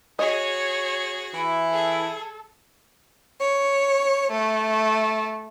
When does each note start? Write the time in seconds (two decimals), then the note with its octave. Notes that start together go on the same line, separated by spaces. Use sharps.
0.19 F#4 G#4 C#5 D#5
1.34 E3 E4
1.73 G#4 A4
3.40 C#5
4.32 A3